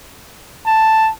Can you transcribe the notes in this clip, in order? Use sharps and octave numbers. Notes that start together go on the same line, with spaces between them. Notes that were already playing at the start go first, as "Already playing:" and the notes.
A5